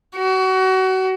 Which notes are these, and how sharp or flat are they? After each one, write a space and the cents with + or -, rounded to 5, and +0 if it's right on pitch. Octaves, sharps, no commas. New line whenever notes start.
F#4 +30